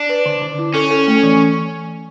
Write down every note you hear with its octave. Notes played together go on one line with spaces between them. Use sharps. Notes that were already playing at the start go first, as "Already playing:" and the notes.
Already playing: D4
B4
D3
D3
E4
C#4 A4
A4
A3
E3